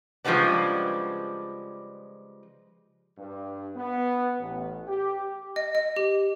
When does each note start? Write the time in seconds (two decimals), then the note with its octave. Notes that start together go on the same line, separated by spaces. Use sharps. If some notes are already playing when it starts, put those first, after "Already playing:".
0.25 C#3 F3 G3 G#3 B3 D4
3.18 G2
3.76 B3
4.38 A1
4.88 G4
5.56 D#5
5.75 D#5
5.96 G4